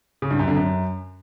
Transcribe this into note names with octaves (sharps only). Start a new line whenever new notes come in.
C#3
G2
F#2
D3
F#2